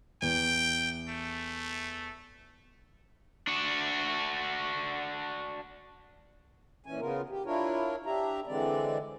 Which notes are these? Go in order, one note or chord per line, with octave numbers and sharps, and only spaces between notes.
E2 G5
A3
D4 F#4
A#2 E3 C#4 G#5
C#3 B3 F4 A#4
G4
D4 E4 F4 A#4 C#5
D4 G4 E5 A#5
D3 E3 G#3 C4 D5